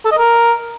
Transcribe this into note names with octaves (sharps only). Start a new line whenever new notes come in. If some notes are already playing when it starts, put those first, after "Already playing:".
A4
D#5
A#4